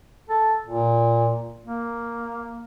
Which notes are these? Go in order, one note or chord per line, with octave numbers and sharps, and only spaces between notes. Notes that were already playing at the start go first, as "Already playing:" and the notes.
A4
A#2
A#3